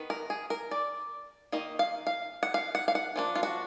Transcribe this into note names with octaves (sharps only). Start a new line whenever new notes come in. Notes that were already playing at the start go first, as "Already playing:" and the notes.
Already playing: D#3 B3
A#4
G#4
A#4
D5
D#3 A#3 D#4 D#5
F5
F5
F#5
F5
F#5
F5
F#5
F3 A#3 D4
F4
F#4